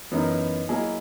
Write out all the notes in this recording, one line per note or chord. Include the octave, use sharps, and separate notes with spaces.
F#2 E3 B3 D#4 A#4
F#3 A#3 E4 G#4 D#5